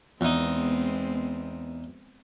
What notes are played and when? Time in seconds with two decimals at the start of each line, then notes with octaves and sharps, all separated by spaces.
0.21 E2 G#3 B3 C4 D#4